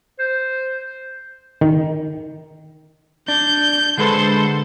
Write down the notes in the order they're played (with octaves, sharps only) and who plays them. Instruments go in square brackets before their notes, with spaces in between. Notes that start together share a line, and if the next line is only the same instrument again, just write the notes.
[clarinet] C5
[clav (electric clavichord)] D#3
[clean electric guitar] D4 [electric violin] G6
[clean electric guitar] D3 G#3 B4 [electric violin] A4 C5